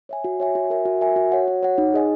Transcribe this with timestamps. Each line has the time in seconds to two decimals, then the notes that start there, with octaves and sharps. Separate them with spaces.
0.09 C#5 E5 G#5
0.24 F#4
0.40 C#5 E5 G#5
0.55 F#4
0.70 A#4 E5 G#5
0.85 F#4
1.01 A#4 E5 G#5
1.16 F#4
1.32 C#5 F#5
1.48 F#4
1.63 C#5 F#5
1.78 D#4
1.94 G#4 D#5 G#5